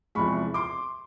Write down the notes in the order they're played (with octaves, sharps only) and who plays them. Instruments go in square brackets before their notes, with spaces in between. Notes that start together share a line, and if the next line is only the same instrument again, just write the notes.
[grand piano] E2 C3 F3 G#3 B5 C#6
C6 D6